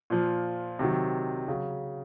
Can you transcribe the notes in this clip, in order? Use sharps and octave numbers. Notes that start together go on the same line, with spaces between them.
A#2 F3
C3 D#3 F#3
C#3 F#3